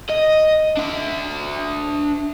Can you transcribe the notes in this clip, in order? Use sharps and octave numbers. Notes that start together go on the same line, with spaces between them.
D#5
D4 E5